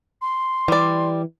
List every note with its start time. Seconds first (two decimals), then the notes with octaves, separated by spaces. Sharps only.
0.22 C6
0.68 E3 G3 D5